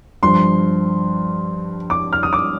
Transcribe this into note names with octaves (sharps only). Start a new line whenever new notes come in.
G2 F3 C6
D6
F6
D#6
D6